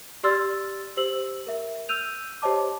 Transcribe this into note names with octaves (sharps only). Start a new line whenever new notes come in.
G4 D5 C6 E6 F6 A6
G4 C5 E6 F#7
A#4 E5
E6 F6 G6 D#7 F7
G4 C5 C#5 D#5 A5 D6